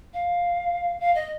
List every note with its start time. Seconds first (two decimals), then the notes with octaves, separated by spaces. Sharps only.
0.14 F5
1.00 F5
1.15 D#5